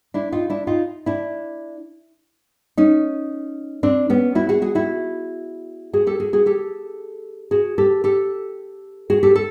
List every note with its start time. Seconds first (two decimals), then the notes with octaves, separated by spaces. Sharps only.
0.14 D4 E4
0.32 D#4 F4
0.50 D4 E4
0.67 D#4 F4
1.06 D4 E4
2.77 C#4 D#4
3.83 C4 D4
4.10 B3 C#4
4.35 E4 F#4
4.49 F#4 G#4
4.62 F#4 G#4
4.75 E4 F#4
5.93 F#4 G#4
6.07 G4 A4
6.20 F#4 G#4
6.33 F#4 G#4
6.46 G4 A4
7.51 F#4 G#4
7.78 G4 A4
8.04 G4 A4
9.10 F#4 G#4
9.23 G4 A4
9.36 A4